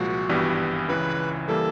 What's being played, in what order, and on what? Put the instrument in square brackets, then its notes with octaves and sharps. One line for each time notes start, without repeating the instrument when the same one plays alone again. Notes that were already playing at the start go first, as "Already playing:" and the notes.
Already playing: [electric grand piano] C2 A#2 F3 G#3 [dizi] F#4
[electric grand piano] G#1 G2 E3 G3 B3
[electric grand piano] C#2 C#3 E3 [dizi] B4
[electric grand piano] E3 G3 A#3 [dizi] A4